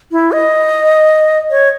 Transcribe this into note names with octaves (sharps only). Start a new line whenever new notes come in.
E4
D#5
C#5